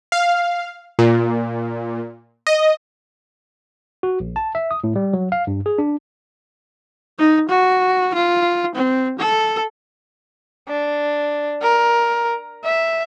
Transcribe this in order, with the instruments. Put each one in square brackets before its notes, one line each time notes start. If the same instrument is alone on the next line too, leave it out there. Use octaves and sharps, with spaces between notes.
[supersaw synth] F5
A#2
D#5
[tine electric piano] F#4
A#1
A5
E5
D#6
A2
G3
F#3
F5
G2
G#4
D4
[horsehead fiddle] D#4
F#4
F4
C4
A4
[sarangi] D4
A#4
E5